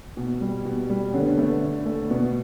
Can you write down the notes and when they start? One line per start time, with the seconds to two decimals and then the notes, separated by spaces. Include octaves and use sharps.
0.17 B2
0.41 G3
0.65 B2
0.89 G3
1.13 D3 C#4
1.22 B3
1.37 A3 B3
1.62 D3
1.85 A3
2.10 B2 B3